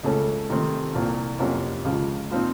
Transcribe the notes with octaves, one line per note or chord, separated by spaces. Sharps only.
C#2 C#3 A3 C#4 A4
C3 D#3 A3 C4
C2 A#2 F3
F2 C3 F#3 A#3 C#4
C#2 C#3 F3
A#2 F3 C4 D#4